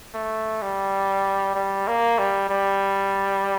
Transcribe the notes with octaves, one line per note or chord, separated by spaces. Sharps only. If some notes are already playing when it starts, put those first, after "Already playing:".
A3
G3
G3
A#3
G3
G3